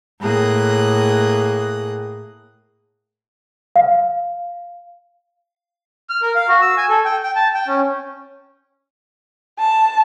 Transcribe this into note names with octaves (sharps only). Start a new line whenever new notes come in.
A2 A#3 G#4 D#6 F#6
F5
F6
A#4
F5
F#4
E6
G#5
A4
G5
G5
A5
G5
C#4
A5